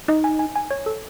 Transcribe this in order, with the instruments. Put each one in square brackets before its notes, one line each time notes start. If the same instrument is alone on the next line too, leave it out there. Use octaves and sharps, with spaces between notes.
[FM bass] D#4 [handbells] D#5
[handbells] G#5
G#5
G#5
C#5
A4